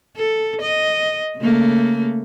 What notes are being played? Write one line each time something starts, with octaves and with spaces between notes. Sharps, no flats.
A4
D#5
C#3 A3 A#3